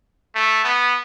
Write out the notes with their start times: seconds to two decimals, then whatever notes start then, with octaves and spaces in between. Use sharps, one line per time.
0.35 A3
0.64 B3